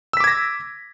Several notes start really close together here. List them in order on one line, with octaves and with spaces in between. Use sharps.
E6 B6 D6 G#6 A#6